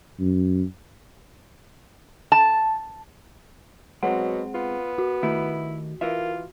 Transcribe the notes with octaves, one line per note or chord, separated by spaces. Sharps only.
F#2
A5
B2 F#3 G#3 C4 F#5
B3 F4
F#4
D#3 A3 E4 G4
E3 F4 A#4 E5